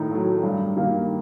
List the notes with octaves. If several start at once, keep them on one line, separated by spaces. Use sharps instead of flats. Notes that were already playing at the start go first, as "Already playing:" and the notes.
Already playing: A2 D#3 D#4
F#3 A3
G2
D#3 G3 A#3